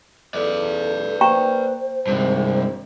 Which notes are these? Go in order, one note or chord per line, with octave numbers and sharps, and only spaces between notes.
E2 A4 B4 D5
A#3 C5 G5 A#5 C#6
G#1 G2 C3